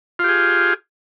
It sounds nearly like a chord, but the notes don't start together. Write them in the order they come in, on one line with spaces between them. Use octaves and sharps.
F4 G4 G#4